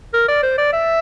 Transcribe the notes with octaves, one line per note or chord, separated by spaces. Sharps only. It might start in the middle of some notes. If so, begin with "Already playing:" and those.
A#4
D5
C5
D5
E5